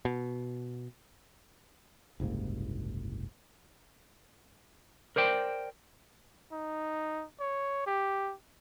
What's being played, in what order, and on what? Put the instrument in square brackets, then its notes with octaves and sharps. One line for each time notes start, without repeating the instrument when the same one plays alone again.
[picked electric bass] B2
[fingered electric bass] F#1 C2 G#2 A#3
[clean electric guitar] A#4 C5 D5 G5
[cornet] D#4
C#5
G4